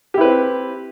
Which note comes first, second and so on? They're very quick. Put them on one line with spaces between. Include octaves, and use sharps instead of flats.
G4 E4 B4 C4